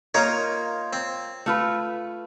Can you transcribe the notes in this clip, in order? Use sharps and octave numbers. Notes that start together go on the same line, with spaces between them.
A#3 D#4 F4 A#4 C#5
C4
A3 F4 B4